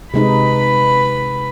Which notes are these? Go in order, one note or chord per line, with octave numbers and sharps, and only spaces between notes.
C3 G#3 D#4 B4 B5